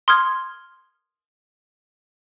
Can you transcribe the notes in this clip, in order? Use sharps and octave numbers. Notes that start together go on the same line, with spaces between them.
C6 D#6 F6 G#6